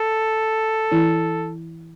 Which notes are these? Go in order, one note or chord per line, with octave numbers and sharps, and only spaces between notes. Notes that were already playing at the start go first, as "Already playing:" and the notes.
Already playing: A4
E3 E4